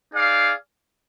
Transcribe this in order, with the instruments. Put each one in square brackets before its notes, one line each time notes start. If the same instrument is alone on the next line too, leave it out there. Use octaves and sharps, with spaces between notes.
[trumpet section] D#4 G#4 D5 F5